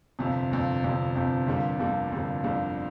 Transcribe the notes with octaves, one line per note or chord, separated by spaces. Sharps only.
G1 F2 C3
G1 F2 C3
G1 F2 C3
G1 F2 C3
G1 F2 D3 G3 A#3
G1 F2 D3 G3 A#3
G1 F2 D3 G3 A#3
G1 F2 D3 G3 A#3